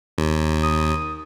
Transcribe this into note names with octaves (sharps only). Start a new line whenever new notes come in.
D#2
D#6